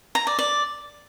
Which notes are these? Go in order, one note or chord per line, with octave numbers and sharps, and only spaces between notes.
A#5
D5
D5